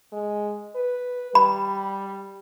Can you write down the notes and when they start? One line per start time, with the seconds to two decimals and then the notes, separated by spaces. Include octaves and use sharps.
0.13 G#3
0.75 B4
1.35 G3 B5